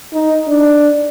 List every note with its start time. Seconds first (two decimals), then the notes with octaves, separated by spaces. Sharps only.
0.14 D#4
0.48 D4